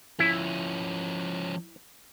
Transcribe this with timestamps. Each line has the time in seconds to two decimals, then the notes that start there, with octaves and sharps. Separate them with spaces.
0.20 F3 C#4 E4